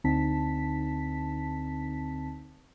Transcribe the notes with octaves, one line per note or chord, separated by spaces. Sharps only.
D2 D3 C4 D#4 A5 B6